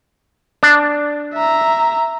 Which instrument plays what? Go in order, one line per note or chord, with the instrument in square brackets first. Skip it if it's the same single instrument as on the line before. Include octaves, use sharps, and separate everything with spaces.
[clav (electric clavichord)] D4
[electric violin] E5 A#5